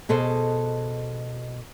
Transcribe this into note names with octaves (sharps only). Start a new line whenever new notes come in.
B2 G#4 A4 C5 D#5